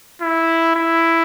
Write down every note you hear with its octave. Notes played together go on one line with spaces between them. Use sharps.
E4
E4